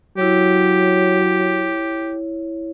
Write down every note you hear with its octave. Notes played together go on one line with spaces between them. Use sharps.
F#3 E4 G4 C#5